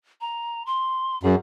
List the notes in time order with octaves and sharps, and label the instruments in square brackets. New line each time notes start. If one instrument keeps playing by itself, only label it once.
[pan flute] A#5
C6
[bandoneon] F#2 [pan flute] G#4